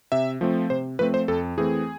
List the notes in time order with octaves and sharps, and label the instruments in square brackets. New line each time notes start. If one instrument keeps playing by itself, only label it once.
[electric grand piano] C3 E5
F3 A3 C4
C3 C5
F3 A3 C4 B4
C5
F2 A4
E3 A3 C4 G#4